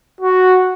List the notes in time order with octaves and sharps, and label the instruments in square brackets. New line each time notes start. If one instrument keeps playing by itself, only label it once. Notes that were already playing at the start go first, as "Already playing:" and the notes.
[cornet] F#4